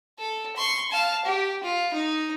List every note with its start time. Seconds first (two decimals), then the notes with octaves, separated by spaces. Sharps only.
0.19 A4
0.56 C6 C#6
0.91 F5 A5
1.25 G4
1.63 F4
1.93 D#4